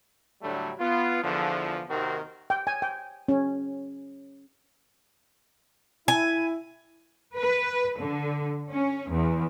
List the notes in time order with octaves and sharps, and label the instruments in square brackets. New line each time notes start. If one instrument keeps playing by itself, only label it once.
[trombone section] A2 D3 F#3 G3 A3 D4
B3 F4
E2 D3 F3
D#2 C3 D#3 C4 F#4 A#4
[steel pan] G5
G#5
G5
C#4
[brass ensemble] E4 [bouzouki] G#5
[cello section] B4
D3
C#4
E2